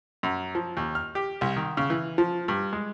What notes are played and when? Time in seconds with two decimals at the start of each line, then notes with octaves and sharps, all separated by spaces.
0.23 F#2
0.55 F3
0.77 D#2
0.95 F6
1.15 G4
1.41 C2
1.56 D#3
1.77 C#3
1.90 E3
2.18 F3
2.48 G2
2.73 G#3